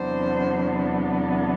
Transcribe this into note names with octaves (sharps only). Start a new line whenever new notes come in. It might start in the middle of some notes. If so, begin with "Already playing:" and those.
Already playing: E2 C3 F#3 B3 D4 C5